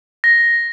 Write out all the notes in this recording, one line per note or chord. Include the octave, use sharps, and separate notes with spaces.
A#6